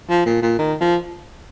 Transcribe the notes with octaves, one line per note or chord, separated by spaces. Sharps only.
F3
A#2
A#2
D#3
F3